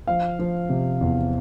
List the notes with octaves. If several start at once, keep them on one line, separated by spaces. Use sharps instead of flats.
F3 F5
F3
C3
E2